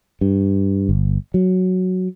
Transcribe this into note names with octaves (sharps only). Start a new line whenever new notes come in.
G2
G1
F#3